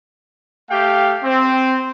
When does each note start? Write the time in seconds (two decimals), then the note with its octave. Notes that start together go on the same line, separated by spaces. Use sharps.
0.70 A3 G4 F5 G5
1.24 C4